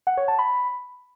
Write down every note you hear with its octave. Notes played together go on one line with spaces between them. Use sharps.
F#5
C#5
A5
B5